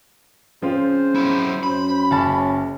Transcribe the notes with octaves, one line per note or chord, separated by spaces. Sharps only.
C#3 F3 C4 F4 C5
F#3 E4
F#2 B5
F#1 C#4 A5 A6